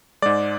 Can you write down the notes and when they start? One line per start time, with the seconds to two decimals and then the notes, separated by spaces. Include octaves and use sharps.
0.22 G#2 G#3 D5